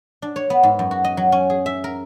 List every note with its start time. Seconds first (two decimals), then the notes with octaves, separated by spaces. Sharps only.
0.22 D4
0.36 C#5
0.50 B3
0.63 G#2
0.79 F#2
0.91 F#4
1.04 D#5
1.17 F#3
1.32 C#4
1.50 G#4
1.66 E5
1.84 A#4